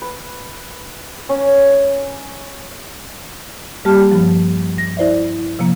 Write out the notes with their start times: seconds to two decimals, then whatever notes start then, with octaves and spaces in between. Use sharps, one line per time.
0.02 B4
1.29 C#4
3.85 G3 A#3 G4 A5 F6
4.11 G2 F3
4.78 A#6
4.97 E4 C5 D5 E5
5.59 C3 F3 A#3